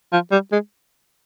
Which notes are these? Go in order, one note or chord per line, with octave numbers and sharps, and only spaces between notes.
F3
G3
G#3